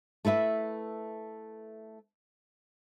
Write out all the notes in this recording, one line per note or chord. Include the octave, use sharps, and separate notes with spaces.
A3 E4 B4 E5